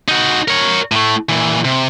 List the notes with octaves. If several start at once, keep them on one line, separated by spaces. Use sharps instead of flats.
D#4 F#4
A#4 C#5
A2 A3
A#2 E3
C3